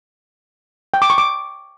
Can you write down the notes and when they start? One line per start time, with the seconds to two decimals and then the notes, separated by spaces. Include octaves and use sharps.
0.94 G5
1.02 D6
1.10 C#6
1.18 D6